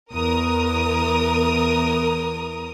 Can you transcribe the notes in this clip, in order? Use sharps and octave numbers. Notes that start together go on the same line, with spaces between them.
E2 A#4 D#6